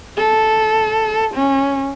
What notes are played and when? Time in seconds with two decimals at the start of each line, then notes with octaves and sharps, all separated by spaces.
0.17 A4
1.35 C#4